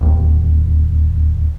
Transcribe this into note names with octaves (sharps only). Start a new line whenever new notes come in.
D1 D#2